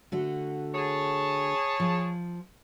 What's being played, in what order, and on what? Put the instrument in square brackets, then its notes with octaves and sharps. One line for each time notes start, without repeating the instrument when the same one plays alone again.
[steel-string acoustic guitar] D3 A3 F#4
[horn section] G#4 C#5 A5
[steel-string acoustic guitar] F3